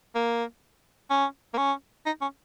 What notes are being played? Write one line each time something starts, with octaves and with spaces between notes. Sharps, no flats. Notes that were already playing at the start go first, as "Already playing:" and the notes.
A#3
C#4
A#3
C#4
D#4
C#4